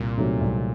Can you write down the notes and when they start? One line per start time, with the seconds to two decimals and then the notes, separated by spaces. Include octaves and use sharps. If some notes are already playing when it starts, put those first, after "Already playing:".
Already playing: C2 A#2
0.17 C3 D#3 F#3 A3
0.41 C2